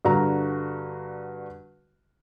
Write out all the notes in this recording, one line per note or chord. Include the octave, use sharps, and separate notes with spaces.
G2 D3 F#4 A#5